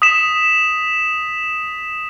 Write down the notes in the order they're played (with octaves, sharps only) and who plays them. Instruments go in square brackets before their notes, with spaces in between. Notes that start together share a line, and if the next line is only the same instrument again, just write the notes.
[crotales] D#6 B6 E7